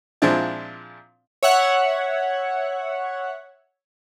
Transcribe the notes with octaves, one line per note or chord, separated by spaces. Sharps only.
A#2 F3 G#3 C4 D4 E4
C#5 E5 F#5 F#6